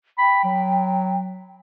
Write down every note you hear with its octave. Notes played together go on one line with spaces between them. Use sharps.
G5 B5
F#3